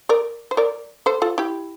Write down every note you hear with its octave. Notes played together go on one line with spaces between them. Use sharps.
A#4 D5
C5
A#4 D5
A4 C5
F4 A4
E4 G4